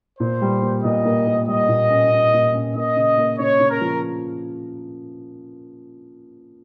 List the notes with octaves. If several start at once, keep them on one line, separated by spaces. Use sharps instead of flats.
A#2 C5
G3
A#3
A#2 D#5
A#3
A#3
G3 D#5
A#2
C#4
C#4
A#2
C#4
A#3 D#5
C#3
A#3
C#3 C#5
C#3
A#4
F3